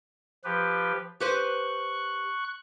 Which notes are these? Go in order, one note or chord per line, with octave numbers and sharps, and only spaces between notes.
F3 G4 B4
G4 B4 C5 C#6 F#6